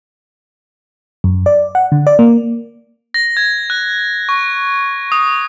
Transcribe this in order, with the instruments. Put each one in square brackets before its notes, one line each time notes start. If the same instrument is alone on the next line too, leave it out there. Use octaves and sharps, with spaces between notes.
[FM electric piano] F#2
D5
F#5
D3
D5
A#3
[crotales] A#6
G#6
F#6
C#6
D#6